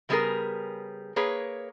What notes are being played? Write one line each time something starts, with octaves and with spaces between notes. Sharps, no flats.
C#3 G3 B3 D#4 G#4 A#4
A#3 G#4 B4 C#5